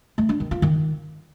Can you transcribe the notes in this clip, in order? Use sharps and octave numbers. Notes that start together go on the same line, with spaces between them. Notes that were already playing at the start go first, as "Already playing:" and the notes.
A3
D4
D#3
F4
D#3